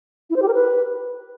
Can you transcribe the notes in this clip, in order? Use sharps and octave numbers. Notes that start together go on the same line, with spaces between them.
E4
C5
G4
A#4
B4